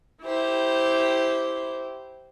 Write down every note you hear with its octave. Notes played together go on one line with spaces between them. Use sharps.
E4 G4 C5